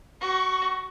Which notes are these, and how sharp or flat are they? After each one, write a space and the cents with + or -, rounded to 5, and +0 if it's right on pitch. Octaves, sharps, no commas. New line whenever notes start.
F#4 +25 C#6 +0